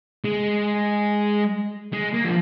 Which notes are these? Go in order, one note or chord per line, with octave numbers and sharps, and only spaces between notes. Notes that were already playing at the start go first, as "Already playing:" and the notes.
G#3
G#3
A#3
F3